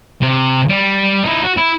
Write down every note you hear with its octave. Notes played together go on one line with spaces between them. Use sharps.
C3
G3
D#4 E4
F#4
E4